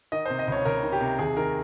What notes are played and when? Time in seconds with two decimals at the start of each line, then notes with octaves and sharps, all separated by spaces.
0.12 D#3 D#5
0.26 C3 C5
0.39 D#5
0.48 C#2 C#5
0.65 C#2 A#4
0.83 D#3
0.92 G4
1.01 C3
1.19 D#2 G#4
1.37 D#3 A#4